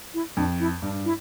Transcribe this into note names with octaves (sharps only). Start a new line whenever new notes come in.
E4
F2 D4
E4
G2 D4
E4